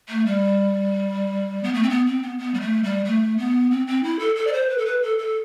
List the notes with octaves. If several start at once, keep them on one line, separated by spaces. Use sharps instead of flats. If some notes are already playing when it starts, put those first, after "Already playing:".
A3
G3
B3
A3
C4
B3
C4
B3
B3
G3
A3
G3
A3
B3
C4
C4
E4
A4
A4
D5
C5
B4
A4
B4
A4
A4